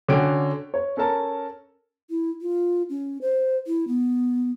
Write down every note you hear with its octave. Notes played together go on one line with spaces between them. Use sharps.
D3 C#4 F#4 G5 D7
C#5
C#4 A4 A#4 A5
E4
F4
C#4
C5
E4
B3